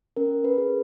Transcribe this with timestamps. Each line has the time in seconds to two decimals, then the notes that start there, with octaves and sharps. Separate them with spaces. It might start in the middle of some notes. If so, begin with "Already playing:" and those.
0.16 C#4 A#4
0.44 B4
0.58 G#4